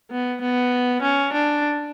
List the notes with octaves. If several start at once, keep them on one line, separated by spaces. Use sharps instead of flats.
B3
B3
C#4
D4